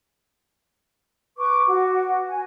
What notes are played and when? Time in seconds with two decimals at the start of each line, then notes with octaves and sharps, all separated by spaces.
1.37 B4 C#6 D6
1.68 F#4 F#5
2.28 G#5